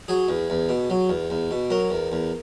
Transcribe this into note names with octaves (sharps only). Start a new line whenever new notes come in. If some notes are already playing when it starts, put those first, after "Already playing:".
F#3 G#4
E2
E2
B2
F#3
E2
E2
B2
F#3 A#4
E2
E2